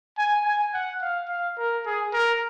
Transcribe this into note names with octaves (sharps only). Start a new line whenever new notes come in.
G#5
G#5
F#5
F5
F5
A#4
G#4
A#4